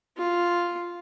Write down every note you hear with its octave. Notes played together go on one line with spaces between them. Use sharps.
F4